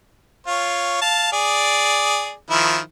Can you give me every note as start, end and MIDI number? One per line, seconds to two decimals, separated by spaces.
0.47 1.00 65
0.47 1.00 73
1.02 1.31 77
1.02 1.31 81
1.32 2.33 68
1.32 2.33 74
2.51 2.78 51
2.51 2.78 53
2.51 2.78 64